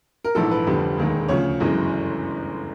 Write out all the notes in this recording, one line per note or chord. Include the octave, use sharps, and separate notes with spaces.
A#4
A#1 G#2 E3 A4
B4
F1 F2 D3 G3
E1 D#2 D#3 G#3
D2 C#3 F3 C#5
G1 F#2 C#3 E3 G#3